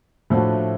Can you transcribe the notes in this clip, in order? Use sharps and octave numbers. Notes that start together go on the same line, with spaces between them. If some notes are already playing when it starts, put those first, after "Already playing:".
A2 F3 A3 D4 F#4